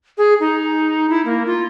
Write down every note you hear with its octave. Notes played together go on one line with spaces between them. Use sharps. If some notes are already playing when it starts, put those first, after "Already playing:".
G#4
D#4
E4
A#3
F4